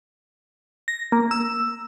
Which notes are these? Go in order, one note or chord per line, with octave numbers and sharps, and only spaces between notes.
A#6
A#3
E6